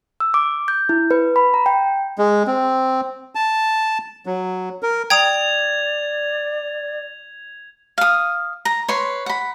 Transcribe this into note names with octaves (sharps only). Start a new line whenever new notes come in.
E6
D6
G6
E4
B4
B5
A#5
G5
G#3
C4
A5
F#3
A#4
D5 G5 A#5 D#6 G#6 F7
F5 D#6
A#5
B4 C#5 C6
F#5 B5